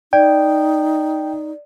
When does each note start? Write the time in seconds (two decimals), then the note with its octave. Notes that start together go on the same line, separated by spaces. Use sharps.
0.13 D#4 D5 G5